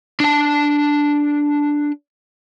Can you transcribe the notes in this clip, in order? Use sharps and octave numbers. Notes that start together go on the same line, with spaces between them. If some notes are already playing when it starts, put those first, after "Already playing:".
D4 A5